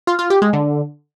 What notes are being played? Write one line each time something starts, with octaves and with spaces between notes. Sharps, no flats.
F4
F4
G4
G#3
D3